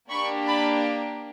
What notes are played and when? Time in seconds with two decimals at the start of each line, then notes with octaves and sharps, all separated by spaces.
0.11 A#3 D4 G4 B5 C#6
0.47 A5 B5